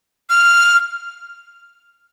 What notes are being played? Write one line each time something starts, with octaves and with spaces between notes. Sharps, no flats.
F6